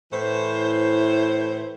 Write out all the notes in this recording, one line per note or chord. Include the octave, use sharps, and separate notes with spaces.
A2 E3 C5